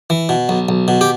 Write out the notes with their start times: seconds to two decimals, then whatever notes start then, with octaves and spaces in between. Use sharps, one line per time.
0.10 E3
0.29 B2
0.49 B1
0.69 B1
0.88 B2
1.01 G4